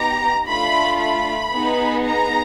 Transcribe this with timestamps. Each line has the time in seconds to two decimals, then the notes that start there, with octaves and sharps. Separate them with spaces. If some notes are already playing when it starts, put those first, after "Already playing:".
Already playing: B3 D#4 G4 A#5
0.48 A3 D4 F4 B5
1.00 B5
1.53 B3 D#4 G#4
2.06 A#5